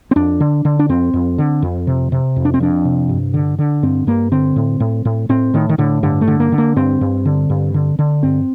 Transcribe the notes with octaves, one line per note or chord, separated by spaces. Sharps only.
C4
F2 D4
D3
D3
D4
F2 C4
F2
D3
F2
C3
C3
F2
D4
C4
F2 D4
C3
G2
D3
D3
G2 C4
G2 A#3
D3 C4
A2
A2
A2
A2 C4
A2 D#3
D#3
A2 D3
G2 D3
A3
D3
A#3
D3
A#3
G2 C4
G2
D3
G2
D3
D3
G2 C4